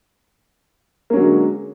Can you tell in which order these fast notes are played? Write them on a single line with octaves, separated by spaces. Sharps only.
A#3 C#4 F#3 D3 G#3